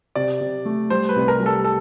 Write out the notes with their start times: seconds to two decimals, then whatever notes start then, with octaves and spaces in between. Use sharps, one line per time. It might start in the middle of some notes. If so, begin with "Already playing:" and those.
0.15 C3 D5
0.41 C3
0.65 A3
0.90 G3 C5
1.09 B4
1.16 C2
1.28 A#4
1.40 G3
1.46 A4
1.64 A4